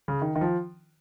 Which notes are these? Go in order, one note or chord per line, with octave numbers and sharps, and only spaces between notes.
C#3
D#3
D#3
F3